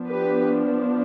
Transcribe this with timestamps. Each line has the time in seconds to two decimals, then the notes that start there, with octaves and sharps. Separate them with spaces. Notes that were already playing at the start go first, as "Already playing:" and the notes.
Already playing: F3 B3 D4
0.08 G4 B4